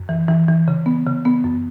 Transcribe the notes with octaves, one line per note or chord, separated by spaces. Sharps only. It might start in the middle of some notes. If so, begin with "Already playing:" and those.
Already playing: F#2
E3
E3
E3
C#3
B3
C#3
B3
F#2